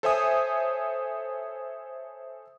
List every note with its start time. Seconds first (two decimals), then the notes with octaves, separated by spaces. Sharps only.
0.03 A4 C5 C#5 E5 G#5 D#6